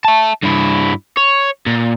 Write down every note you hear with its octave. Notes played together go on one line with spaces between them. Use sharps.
E5 A5
G2 E4
C#5
A#2